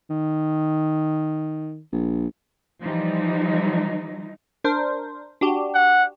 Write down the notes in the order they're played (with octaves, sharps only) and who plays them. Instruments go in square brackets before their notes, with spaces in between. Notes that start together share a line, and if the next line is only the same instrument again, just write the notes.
[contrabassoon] D#3
A#1
[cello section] E3 F3 G3 D#4
[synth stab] D4 A#4 C5
D4 F#4 G4
[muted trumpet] F#5